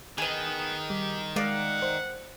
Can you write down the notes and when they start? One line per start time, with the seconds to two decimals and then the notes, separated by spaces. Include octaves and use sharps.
0.18 D#3 B3 G#4 D#5
0.90 G3 G4
1.36 G#3 A#4 D5 F5 F#5
1.82 C5